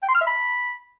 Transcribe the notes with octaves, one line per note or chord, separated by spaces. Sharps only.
G5
C6
F6
E5
B5